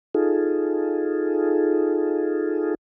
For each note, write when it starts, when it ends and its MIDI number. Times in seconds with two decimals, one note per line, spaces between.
0.15 2.74 63
0.15 2.74 65
0.15 2.74 68
0.15 2.74 69